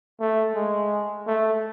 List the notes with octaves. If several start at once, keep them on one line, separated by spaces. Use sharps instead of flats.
A3
G#3
A3